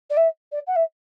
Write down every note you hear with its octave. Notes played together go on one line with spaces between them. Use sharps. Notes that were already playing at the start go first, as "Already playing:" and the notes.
D5
E5
D5
F#5
E5